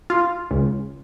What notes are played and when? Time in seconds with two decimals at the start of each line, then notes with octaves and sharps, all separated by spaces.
0.10 F4
0.51 C#2